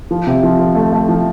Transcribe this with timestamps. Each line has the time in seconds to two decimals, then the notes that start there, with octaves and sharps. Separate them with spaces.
0.11 F3
0.27 C3
0.44 F3
0.59 F3
0.75 A3
0.92 A3
1.09 F3